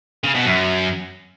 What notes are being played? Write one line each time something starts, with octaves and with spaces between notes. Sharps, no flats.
C#3
B2
F#2